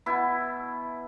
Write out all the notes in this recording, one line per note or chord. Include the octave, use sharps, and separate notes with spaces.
B2 E4